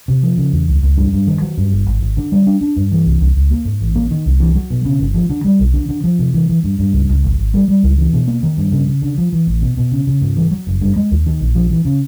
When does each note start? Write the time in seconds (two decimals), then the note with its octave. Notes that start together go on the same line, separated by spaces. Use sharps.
0.08 C3
0.23 F3
0.38 C#3
0.52 E2
0.68 C#2
0.83 C#2
0.97 G2
1.13 G2
1.27 D#3
1.42 F#3
1.57 G2
1.72 G1
1.86 G#1
2.01 G#1
2.17 D3
2.32 G3
2.47 D4
2.61 D4
2.76 G2
2.92 E3
3.05 C2
3.20 C2
3.36 C#2
3.51 A#3
3.65 G#2
3.81 A1
3.95 A#3
4.11 D#3
4.26 C2
4.40 E3
4.55 F#3
4.70 B2
4.85 C#3
5.00 G1
5.14 F3
5.30 D3
5.44 G3
5.59 B1
5.74 D3
5.89 D3
6.04 F3
6.19 C3
6.34 E3
6.49 E3
6.64 G2
6.79 G2
6.93 C#2
7.09 C#2
7.24 G#1
7.38 G#1
7.54 G3
7.68 G3
7.83 C#2
7.98 E3
8.13 B2
8.28 A#3
8.43 D#3
8.57 G2
8.72 C#3
8.88 C#3
9.02 D3
9.18 F3
9.33 E3
9.47 A1
9.62 B2
9.77 B2
9.92 C#3
10.07 C#3
10.21 G#2
10.37 E3
10.51 F#3
10.67 F#1
10.81 G2
10.96 G#3
11.11 D#2
11.26 D#3
11.40 A#1
11.55 F3
11.71 E3
11.85 C#3